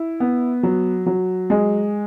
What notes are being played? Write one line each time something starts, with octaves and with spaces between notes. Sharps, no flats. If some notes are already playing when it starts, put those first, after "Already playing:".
Already playing: E4
B3
F#3
F#3
G#3